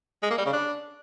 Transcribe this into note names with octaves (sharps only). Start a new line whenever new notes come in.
G#3
A#3
G3
C#3
D4